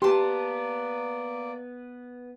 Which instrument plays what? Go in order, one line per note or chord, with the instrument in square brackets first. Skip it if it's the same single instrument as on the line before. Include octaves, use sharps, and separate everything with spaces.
[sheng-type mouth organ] A#3 D5 [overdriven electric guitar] B3 [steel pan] G4 [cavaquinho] A5 C6